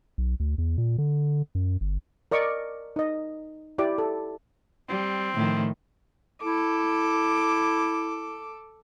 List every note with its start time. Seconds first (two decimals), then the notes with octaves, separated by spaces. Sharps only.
0.18 B1
0.40 D2
0.58 E2
0.78 A#2
0.98 D3
1.55 F#2
1.81 G1
2.31 A#4 D5 D#5 C#6 D6
2.96 D#4 D#5
3.78 E4 G4 D5 D6
3.98 A4
4.89 G3 C4
5.35 A2 D#3 F3
6.43 E4 A4 D6